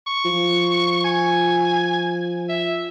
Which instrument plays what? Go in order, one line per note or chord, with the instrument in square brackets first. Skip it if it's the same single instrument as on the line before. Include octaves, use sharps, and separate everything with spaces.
[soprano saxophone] C#6
[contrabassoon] F3
[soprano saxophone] G#5
E5